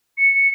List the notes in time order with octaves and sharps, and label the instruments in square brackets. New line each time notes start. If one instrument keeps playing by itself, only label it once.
[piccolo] C#7